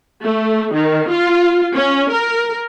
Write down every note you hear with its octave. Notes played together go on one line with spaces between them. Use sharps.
A3
D#3
F4
C#4
A#4